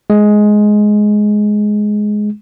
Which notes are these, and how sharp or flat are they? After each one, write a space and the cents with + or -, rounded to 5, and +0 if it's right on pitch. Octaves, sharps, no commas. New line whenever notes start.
G#3 +10